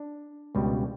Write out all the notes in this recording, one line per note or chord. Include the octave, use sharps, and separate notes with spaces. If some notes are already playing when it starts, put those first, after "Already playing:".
Already playing: D4
C#2 B2 G3